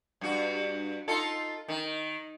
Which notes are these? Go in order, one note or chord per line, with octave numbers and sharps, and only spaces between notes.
G2 F#4
D#4 F4 A4
D#3